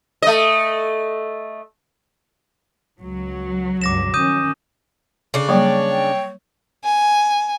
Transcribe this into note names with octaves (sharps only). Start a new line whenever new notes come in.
A3 D#5
C#2 F#3
C#2 G2 D6 A#6 E7
D#3 C#4 D#6 G6 D#7
C#3 D4
F#3 G3 A#3 C#5 G5
G5
G#5